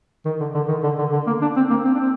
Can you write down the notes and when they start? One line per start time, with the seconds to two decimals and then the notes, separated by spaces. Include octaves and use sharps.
0.25 D#3
0.40 D3
0.55 D3
0.68 D#3
0.83 D3
0.98 D3
1.12 D3
1.27 A#3
1.42 D4
1.56 C4
1.70 A#3
1.85 C4
1.94 D4
1.99 C4